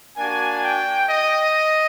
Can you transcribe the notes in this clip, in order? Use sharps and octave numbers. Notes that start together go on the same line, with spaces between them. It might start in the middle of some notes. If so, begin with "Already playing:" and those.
A#3 D4 F#4 G#5
G5
D#5